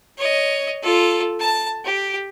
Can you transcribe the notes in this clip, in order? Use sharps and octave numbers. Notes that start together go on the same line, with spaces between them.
C#5 D#5
F4 A4
A5
G4